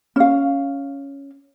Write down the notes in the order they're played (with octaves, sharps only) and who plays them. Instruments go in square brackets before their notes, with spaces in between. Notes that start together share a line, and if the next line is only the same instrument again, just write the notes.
[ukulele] C#4 F5